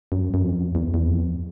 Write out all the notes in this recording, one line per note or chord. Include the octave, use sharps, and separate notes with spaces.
F#2
F#2
F2
E2
E2
F2